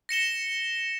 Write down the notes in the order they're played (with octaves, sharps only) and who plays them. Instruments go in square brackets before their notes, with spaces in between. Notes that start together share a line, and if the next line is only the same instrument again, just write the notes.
[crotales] A#6 C#7 E7 G7